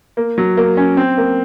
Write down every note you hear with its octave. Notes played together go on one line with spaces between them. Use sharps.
A#3
F#3
A#3
C#4
C4
A#3